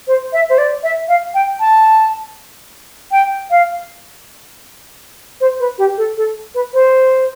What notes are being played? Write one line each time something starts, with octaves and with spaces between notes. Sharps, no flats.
C5
E5
C5
D5
E5
F5
G5
A5
G5
F5
C5
B4
G4
A4
A4
B4
C5